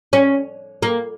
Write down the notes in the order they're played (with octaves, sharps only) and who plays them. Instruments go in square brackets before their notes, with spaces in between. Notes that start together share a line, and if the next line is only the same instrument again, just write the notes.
[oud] C#4
A#3